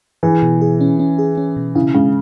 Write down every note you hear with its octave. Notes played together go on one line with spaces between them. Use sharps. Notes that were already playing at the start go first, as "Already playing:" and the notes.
E3 G#4
B2
G#4
C#4
C#4
G#4
C#4
B2
C#3 E4
C#3 G#3